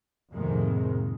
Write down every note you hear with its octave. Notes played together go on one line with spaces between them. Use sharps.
F2 A2 C3 D#3 G#3 A#3